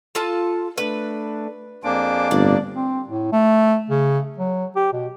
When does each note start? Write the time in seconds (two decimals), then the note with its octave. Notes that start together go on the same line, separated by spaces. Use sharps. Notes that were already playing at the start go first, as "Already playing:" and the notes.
0.15 F4 A4 A5
0.78 A3 D4 B4
1.84 F2 A#3 D4 G#4 C5 D6
2.31 G1 A2 C4 D5
2.76 C4
3.08 A2
3.32 A3
3.90 C#3
4.38 F#3
4.76 G4
4.93 B2